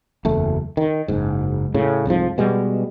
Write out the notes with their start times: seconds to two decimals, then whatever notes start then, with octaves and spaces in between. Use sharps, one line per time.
0.25 F#1 E2 A3
0.77 D#3
1.08 F#1 G#2
1.74 A2 C#3
2.06 C2 F2 G#2 F3
2.38 B2 G3 G#3 B3